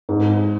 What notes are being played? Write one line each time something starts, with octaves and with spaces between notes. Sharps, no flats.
G#2